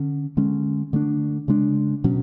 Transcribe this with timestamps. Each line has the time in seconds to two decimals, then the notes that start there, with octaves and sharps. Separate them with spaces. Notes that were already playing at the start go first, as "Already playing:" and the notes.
Already playing: D3 C#4
0.37 D3 G#3 C#4
0.93 D3 A3 D4
1.48 C#3 G#3 D4
2.04 B2 F#3 C#4